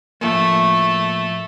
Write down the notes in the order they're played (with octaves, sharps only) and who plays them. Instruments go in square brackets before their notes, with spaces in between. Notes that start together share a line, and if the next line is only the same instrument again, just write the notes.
[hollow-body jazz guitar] A2 F3 A#3 [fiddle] A3